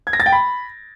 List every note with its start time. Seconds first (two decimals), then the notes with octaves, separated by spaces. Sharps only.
0.07 G#6
0.13 A#6
0.20 A6
0.26 G5
0.32 B5